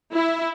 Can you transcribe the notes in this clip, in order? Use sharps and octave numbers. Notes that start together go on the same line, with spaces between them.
E4